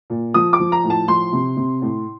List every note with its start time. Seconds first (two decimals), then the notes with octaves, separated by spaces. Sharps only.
0.10 A#2
0.34 F3 D#6
0.53 D6
0.60 F3
0.72 A#5
0.84 A2
0.90 A5
1.08 F3 C6
1.33 C3
1.57 C3
1.82 A2